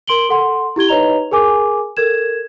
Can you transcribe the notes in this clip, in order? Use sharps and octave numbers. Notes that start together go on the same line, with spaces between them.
A#4 C6 D7 F#7 G7
A4 F#5 C6
E4 G4 G#6 G7
D#4 B4 C#5 D#5 A#5 F7
G#4 A#4 G#5 D6
A4 A#4 G#6 E7